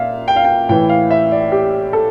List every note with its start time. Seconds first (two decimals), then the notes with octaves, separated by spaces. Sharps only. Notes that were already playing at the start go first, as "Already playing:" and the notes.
Already playing: A#2 E5 F5
0.28 G5
0.36 F5
0.44 G5
0.69 A2 E3 G5
0.89 F5
1.11 E5
1.32 D5
1.52 G4
1.93 A4